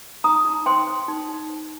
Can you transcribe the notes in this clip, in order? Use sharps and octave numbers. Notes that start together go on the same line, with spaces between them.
D#4 A#5 D#6
D#4
C5 G5 C6
C5
D#4
D#4
C5